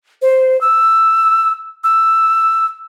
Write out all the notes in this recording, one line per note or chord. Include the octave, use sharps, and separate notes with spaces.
C5
E6
E6